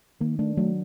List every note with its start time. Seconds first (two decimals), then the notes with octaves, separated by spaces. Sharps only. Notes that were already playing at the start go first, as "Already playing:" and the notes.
0.21 D#3 A#3
0.39 A3 D4
0.57 F#3 A3